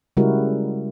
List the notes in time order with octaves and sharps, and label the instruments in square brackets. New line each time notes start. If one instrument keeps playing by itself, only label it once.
[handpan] C#3 G3 G#3 E4 F#4 A#4